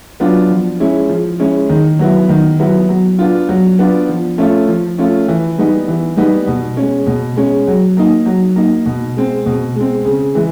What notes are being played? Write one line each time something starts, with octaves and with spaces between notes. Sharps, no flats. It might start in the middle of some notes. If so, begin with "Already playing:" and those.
F#3 B3 D4 F4
F3
G#3 C#4 E4
F3
G#3 C#4 E4
D#3
F#3 B3 E4
D#3
F#3 B3 E4
F#3
B3 D4 F4
F#3
B3 D4 F4
F3
A3 C#4 F4
F3
A3 C#4 F4
E3
G3 B3 D#4
E3
G3 B3 D#4
B2
G#3 C#4
B2
G#3 C#4
F#3
A#3 D#4
F#3
A#3 D#4
B2
G#3 C4
B2
G#3
C4
C#3
E3 G#3